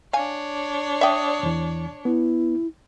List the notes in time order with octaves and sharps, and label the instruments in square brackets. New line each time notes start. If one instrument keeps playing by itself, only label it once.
[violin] D4 C#5 [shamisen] F5 G#5
[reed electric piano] D5 D#6 [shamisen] E5 G5
[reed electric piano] E2 E3
[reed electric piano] B3 [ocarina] E4